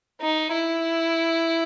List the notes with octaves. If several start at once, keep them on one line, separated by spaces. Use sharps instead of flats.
D#4
E4